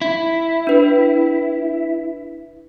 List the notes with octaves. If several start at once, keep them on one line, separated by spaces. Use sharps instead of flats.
E4
D4 B4